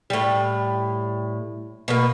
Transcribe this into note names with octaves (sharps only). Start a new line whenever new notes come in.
A2 G3
B2 A#3